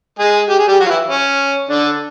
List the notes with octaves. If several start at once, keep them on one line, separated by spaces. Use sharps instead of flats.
G#3 G#4
G4
G#4
G3 G4
F#3 F#4
F4
E3 E4
C#4
D3 D4